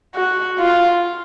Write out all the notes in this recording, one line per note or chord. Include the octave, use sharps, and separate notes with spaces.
F#4
F4